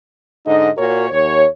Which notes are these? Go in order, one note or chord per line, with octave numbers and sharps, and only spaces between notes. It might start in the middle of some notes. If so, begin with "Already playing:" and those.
G#2 D3 D#4 D#5
A#2 F#4 A#4 C#5
D#2 C#5